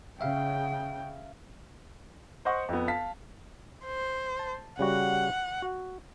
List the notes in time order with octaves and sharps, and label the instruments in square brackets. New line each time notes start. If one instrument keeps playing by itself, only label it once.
[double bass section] C#3 [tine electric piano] E5 F5 [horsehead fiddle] G5
[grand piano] C5 D#5 F#5 C#6
F2 B3
F5 A5 B6
[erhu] C5
[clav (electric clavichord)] A5
[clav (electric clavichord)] C#3 G3 F#4 [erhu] F#5
[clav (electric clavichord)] F#4